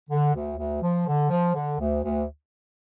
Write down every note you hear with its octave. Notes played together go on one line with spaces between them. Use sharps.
D3
D2
D2
F3
D3
F3
D3
D2
D2